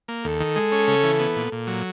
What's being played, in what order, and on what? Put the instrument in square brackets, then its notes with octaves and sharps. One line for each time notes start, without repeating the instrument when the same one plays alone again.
[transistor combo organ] A#3
[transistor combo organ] D#2 [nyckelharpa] A4
[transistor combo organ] D#3
G#3
C#4
C#3
E3
B3
A#2
A#2
F#3